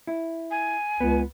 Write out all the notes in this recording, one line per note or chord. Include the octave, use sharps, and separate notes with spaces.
E4
G#5
C#2 B3